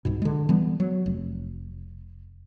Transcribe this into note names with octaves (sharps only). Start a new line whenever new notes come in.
C2 G#2 B2
D3 G#3
E3 G3 B3
F#3
F1